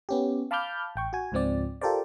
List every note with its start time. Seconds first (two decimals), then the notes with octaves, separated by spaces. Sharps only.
0.09 B3 C#4 G4
0.51 F5 A5 B5 D6 F6 G6
0.96 A1 G5 C#6
1.13 F#4 G#5
1.32 C#2 G#2 F3 C4 D5
1.82 F4 G4 A4 A#4 C5 D5